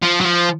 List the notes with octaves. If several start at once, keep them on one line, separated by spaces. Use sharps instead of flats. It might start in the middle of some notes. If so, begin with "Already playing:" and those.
F3
F#3
F3